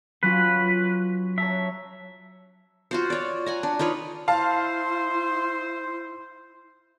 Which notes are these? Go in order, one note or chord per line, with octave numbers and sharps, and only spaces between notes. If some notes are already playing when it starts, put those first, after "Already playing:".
F#3 C#4 F4 B4
C#5 E5 A5 A#5
F4 F#4 C5
C#5 D5
F#5 G#5 A#5
D4
D#4 F4 B4 C#5
E4 C5 F5 A5 C6